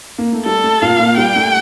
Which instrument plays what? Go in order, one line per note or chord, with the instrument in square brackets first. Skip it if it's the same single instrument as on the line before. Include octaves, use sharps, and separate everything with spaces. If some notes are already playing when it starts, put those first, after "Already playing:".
[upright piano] A#3
A3
[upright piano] G3 [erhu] A4
[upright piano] A3
[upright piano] A#2 A#3 [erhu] F5
[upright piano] A#2 A#3
[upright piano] G3 [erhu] G5
[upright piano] A3